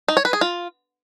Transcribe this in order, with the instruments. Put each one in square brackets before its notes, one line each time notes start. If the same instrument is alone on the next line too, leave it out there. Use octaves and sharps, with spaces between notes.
[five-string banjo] D#4
C#5
B4
G#4
F4